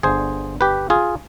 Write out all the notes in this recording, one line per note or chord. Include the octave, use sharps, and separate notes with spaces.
G1 G2 D3 G#4 C5
G4 B4
F4 G#4